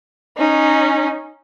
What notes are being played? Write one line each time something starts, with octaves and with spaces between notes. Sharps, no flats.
C#4 D#4